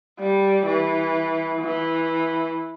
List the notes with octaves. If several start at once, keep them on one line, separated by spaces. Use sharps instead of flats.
G3
E3
E3